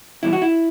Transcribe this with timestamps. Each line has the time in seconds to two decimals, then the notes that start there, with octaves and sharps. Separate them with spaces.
0.23 E2 B2 G3 E4
0.33 F#4
0.42 E4